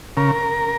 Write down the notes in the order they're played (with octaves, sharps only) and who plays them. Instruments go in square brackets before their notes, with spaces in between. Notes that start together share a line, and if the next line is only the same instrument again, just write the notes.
[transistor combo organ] C#3 A#4